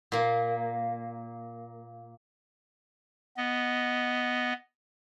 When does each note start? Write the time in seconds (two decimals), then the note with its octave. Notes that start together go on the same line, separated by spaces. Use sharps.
0.12 A#2 A#3
3.37 B3 D#5